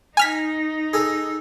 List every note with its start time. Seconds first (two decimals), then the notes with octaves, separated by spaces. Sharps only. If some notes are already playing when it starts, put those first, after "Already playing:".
0.17 D#4 G#5 F6 B6
0.93 G#4 A4